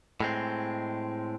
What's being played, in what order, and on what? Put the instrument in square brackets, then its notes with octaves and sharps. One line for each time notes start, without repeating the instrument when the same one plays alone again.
[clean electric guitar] A2 G#3 C4